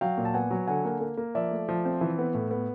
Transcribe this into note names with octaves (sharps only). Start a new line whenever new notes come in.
F#3 F5 G5
A#2
A5
B3 F#5 G#5
F#3
D3 F#5 G#5
A#3
A#3
A#3
F3 D5 E5
A3
F3
C4
E3
B3
A2
B3